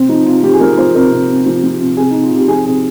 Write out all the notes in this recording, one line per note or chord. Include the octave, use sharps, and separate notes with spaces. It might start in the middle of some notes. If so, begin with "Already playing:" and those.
Already playing: C3 C4
F3 D#4
C3 F4
F3 G4
G#4
F3 A#4
F3 C5
C3 A#4
C3
C3
F3
F3
C3
C3 G#4
D#4
C3
F4
C3 G4
F3 G#4
C3 G#4